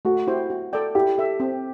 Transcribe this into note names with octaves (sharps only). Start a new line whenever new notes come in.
A3 F#4
E4 G4 C5 G5
F#4
A4 D5 G5
E4 G4
A4 E5
C4